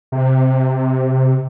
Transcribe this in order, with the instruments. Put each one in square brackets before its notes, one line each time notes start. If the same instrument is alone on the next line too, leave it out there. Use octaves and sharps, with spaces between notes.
[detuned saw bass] C3